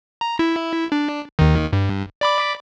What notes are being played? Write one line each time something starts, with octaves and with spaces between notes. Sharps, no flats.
A#5
E4
D4
D#2 D#3
G2
D5 B5 D6